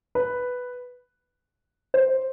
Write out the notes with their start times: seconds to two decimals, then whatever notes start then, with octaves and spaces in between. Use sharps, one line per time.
0.15 B4
1.94 C5